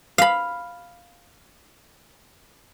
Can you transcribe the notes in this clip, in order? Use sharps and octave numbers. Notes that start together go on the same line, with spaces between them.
F5 B5